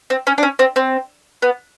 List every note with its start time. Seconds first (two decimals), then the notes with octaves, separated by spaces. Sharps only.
0.10 C4
0.27 C#4
0.38 D4
0.43 C#4
0.59 C4
0.76 C4
1.42 B3